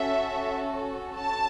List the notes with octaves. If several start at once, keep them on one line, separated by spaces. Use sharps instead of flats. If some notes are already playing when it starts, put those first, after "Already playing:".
Already playing: C#4 F#4 A4 E5
A5